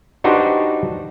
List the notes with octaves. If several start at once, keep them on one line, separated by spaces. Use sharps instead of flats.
D4 D#4 F#4 G4 B4 C5